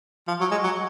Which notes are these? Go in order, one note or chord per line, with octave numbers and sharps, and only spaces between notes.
F3
F#3
G#3
F#3